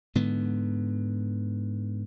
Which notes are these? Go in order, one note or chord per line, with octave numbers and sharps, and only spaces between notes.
G#2 D3 B3